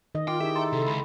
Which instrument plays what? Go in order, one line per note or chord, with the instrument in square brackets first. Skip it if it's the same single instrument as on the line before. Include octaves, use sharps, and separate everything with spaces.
[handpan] D#3 D#5
[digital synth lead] F4 [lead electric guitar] G5 [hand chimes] D6
[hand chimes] D#4 G4 G#4 [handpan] E4 [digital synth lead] E5
[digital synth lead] A4 [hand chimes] E5 A#5 C6
[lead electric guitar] C3
[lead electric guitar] C#2 [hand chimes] B5